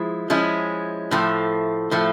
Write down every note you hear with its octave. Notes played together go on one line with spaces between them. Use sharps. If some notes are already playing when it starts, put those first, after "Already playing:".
Already playing: F3 G#3 E4
F3 G#3 C#4 E4
A2 F3 A3
A2 F3 A3